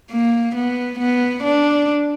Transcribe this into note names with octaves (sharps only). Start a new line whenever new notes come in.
A#3
B3
B3
D4